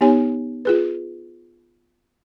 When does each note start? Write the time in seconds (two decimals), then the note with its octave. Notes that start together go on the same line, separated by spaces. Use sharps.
0.01 B3 D#4 G4 C#5 G#5
0.65 F4 G#4 B4